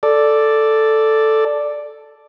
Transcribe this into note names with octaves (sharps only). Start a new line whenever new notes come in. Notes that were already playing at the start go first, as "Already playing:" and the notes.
A4 D5